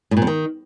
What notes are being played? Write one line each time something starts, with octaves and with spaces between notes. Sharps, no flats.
A2
A#2
F2
D#3